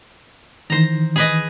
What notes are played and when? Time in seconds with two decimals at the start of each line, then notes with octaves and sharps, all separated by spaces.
0.70 D#3 E3 C5 A#5
1.16 G#4 B4 D#5